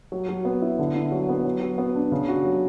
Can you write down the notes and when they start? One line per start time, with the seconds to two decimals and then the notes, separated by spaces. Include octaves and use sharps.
0.12 F#3
0.29 F#3
0.45 B3
0.62 E4
0.79 D3
0.95 E4
1.12 F#3
1.29 B3
1.45 F#3
1.61 F#3
1.78 B3
1.95 D4
2.12 C#3
2.28 F#4
2.44 F#3